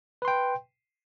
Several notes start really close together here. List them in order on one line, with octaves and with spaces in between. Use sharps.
B4 C6 G5